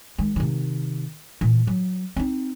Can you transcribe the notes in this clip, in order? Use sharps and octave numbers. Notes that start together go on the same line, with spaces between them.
D#3 G#3
C3 D#3
A#2 E3
F#3
C4 D#4